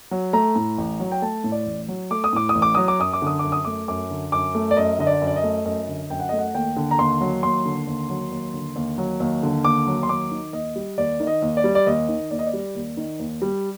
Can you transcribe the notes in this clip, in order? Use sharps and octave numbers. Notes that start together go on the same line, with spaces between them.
F#3
A3 A#5
A2
A1
F#3
G5
A3 A5
A2
D5
A1
F#3
A3 D6
D#6
A2 D6
D#6
A1
D6
F#3 D#6
D6
F#2 D#6
D6
D3 D#6
F#2 D6
D#6
A3 D6
F#2 D6
D3
F#2 D6
A3
D5
F#2 D#5
D3 D#5
D5
F#2
D5
D#5
A3
F#2 D#5
D3
F#2 G5
F#5
A3 D#5
F#5
D#2 G5
D3
A#5
D#2 C6
F#3
D#2 C6
D3
D#2
F#3
D#2
D3
D#2
F#3
D#2
D3
D#2 D6
F#3
C6
D#2 D6
D#3
D#2 D#5
G3
D#2 D5
D#3
D#5
D#2
D5
G3
D5
D#2 D#5
D#3
D#2 D5
D#5
D5
G3
D#2
D#3
D#2
G3